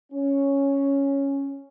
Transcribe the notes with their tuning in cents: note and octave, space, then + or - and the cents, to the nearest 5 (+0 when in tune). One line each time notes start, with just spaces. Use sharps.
C#4 +0